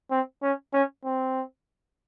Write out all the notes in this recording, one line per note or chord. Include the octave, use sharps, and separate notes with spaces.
C4
C#4
C#4
C4